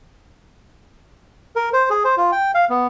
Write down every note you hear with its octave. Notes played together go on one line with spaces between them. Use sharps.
A#4
C5
G#4
C5
F4
G5
F5
B3